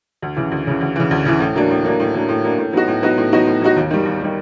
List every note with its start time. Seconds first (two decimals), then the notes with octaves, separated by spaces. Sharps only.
0.22 D2
0.36 C#3 E3
0.51 D2
0.67 C#3 E3
0.81 D2
0.96 C#3 E3
1.11 D2
1.25 C#3 E3
1.40 A2
1.56 F#3 A#3 D4
1.70 A2
1.84 F#3 A#3 D4
2.00 A2
2.14 F#3 A#3 D4
2.29 A2
2.44 F#3 A#3 D4
2.58 A2
2.73 F#3 B3 D#4 F#4
2.88 A2
3.03 F#3 B3 D#4 F#4
3.18 A2
3.32 F#3 B3 D#4 F#4
3.47 A2
3.62 F#3 B3 D#4 F#4
3.76 D#2
3.91 D#3 G3
4.05 D#2
4.21 D#3 G3